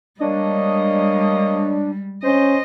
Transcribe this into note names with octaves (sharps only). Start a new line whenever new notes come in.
G3 G#3 A#3 D4 C#5 D#5
C#4 C5 D#5